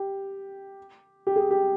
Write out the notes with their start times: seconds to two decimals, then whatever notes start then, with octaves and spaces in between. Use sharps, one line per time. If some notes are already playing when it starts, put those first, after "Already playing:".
Already playing: G4
1.27 G4
1.36 G#4
1.51 G4